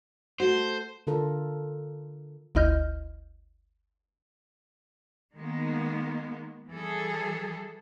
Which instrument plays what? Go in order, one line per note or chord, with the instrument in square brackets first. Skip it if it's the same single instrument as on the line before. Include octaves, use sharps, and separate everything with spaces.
[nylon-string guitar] A3 F#4 [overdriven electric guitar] C5
[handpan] D3 F4 A4 A#4
[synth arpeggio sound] G1 D2 E4 D#5 F6 G6
[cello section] D#3 G#3 A#3 B3
E3 G3 G#4 A4